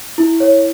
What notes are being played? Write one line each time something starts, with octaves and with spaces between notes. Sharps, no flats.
E4
C#5